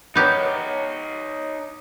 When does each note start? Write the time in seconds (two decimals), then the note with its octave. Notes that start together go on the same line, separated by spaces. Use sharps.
0.15 B3 D#4 G4 A#4 C#5